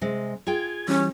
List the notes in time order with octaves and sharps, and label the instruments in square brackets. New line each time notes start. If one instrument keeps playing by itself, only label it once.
[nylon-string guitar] C3 G#3
[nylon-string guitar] F4 G#4 G5 [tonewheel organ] G#6
[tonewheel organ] E3 G3 [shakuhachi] C#4